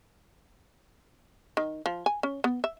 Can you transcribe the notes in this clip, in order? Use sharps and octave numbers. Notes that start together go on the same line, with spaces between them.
D#3
F3
G#5
C#4
B3
E5